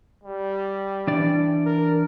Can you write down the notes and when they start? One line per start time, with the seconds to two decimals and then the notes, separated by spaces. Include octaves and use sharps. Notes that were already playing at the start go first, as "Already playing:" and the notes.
0.24 G3
1.07 E3 D4 D5
1.66 A#4